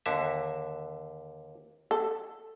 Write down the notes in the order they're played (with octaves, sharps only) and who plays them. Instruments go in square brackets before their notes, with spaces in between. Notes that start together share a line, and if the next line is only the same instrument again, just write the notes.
[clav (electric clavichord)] D#2 D3 E5
[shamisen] A4